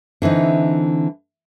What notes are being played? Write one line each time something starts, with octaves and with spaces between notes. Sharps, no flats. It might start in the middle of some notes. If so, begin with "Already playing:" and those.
D3 E3 C4 D#4